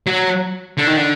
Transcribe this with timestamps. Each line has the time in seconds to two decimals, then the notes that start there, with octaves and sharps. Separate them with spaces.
0.07 F#3
0.78 D3
0.87 D#3
0.97 D3